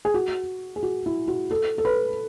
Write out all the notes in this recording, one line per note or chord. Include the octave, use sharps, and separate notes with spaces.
G#4
F#4
G#4
F#4
E4
F#4
A4
A4
B4